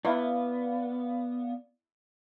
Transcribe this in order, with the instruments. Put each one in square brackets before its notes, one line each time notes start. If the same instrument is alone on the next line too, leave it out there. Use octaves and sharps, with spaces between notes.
[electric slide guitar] B3 [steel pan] E4 [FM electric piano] D5 F5